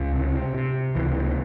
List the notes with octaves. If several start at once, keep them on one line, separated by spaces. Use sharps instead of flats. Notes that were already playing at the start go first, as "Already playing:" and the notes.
Already playing: C#2
C3
C3
C#2 E3